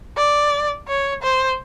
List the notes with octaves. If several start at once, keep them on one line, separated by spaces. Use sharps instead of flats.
D5
C#5
C5